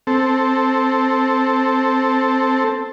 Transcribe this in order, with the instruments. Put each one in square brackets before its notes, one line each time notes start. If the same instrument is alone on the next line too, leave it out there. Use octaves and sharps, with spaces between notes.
[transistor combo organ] C4 A4